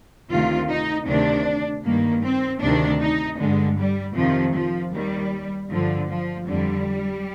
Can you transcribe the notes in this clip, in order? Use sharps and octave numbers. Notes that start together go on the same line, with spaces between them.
D2 C3 D#3 F4
D#4
D2 C3 D#3 D4
G2 D#3 A#3
C4
D2 C3 D#3 D4
D#4
G2 D3 G#3
G3
F2 C3 D#3 F3
F3
D#2 D#3 G3
G2 D3 F3
F3
F2 D3 G3